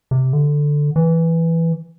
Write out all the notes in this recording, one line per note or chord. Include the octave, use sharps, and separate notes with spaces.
C3
D3
E3